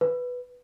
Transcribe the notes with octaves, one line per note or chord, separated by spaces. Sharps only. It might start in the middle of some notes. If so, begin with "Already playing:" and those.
B4